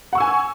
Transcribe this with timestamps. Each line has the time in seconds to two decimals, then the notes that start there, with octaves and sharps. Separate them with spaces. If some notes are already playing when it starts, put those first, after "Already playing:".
0.13 F#5
0.15 C#6
0.18 E6
0.20 G#5